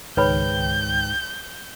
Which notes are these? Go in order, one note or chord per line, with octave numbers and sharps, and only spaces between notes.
C#2 G#2 D#3 B4 C#5 G5 B5 G6